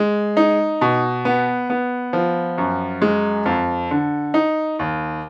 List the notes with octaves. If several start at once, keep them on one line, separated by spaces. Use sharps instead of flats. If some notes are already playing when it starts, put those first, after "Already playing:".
Already playing: G#3
D#4
B2
B3
B3
F3
F#2
G#3
F2
D3
D#4
D#2